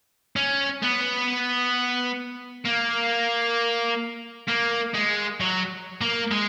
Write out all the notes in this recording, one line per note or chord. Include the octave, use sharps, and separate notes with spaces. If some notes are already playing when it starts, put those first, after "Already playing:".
C#4
B3
A#3
A#3
G#3
F#3
A#3
G#3